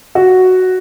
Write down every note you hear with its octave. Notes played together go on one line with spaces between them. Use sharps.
F#4